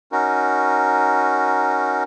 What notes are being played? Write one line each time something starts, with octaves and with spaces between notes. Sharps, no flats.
C#4 D#4 F#4 A#4